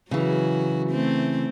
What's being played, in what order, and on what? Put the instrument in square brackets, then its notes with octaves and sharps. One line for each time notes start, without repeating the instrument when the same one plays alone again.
[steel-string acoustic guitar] C#3 E3 [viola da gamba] F#3 F#4
[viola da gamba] A3 C4